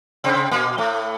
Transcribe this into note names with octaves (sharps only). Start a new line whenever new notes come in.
C3 C4
A#2 A#3
A2 A3